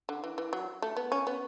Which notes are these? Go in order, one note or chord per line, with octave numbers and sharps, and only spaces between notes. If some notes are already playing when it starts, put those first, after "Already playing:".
D3
E3
E3
F#3
A3
B3
C#4
B3